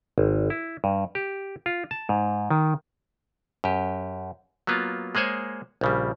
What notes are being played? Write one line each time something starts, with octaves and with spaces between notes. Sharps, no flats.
G#1
E4
G2
G4
F4
A5
G#2
D#3
F#2 G4
F#3 A#3 B3 F4
G#3 A#3 G#4 C5 C#5
A#1 C#3 G3